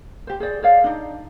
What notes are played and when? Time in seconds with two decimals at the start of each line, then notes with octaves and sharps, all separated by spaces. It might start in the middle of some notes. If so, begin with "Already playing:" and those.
0.27 G4 C5
0.40 G#4 C5 D5
0.62 G#4 C#5 D5 F5
0.84 D4 D#4